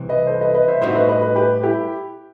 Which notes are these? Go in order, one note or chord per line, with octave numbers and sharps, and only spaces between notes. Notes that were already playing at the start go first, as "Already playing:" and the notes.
Already playing: C2 C3 E3
B4 D#5
A4 C5
B4 D#5
B4 D#5
C5 E5
A2 G3 C4 D#4 F#4 C5 E5
B4 D#5
B4 D#5
B4 D#5
G4 B4
E4 G4